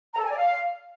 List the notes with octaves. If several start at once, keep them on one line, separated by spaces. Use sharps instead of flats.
A#5
A4
G#5
D5
F5